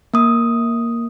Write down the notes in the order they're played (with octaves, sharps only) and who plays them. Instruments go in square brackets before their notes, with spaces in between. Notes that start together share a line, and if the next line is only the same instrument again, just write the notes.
[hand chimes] A#3 D#6